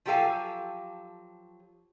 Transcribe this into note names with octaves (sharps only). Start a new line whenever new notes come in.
F3 F#3 G4 A4 F5 G#5